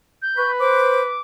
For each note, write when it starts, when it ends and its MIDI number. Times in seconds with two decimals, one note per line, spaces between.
0.22 0.52 91
0.37 1.16 71
0.37 0.51 85
0.60 1.01 72
0.60 1.22 86